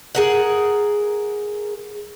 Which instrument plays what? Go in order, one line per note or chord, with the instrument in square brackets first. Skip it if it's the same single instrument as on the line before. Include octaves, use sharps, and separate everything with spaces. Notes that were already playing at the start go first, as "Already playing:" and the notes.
[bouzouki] G#4 A#4 F#5